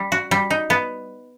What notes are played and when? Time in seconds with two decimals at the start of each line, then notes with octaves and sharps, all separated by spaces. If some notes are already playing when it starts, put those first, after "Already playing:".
Already playing: G3
0.12 F#4
0.31 G3
0.51 D#4
0.70 B3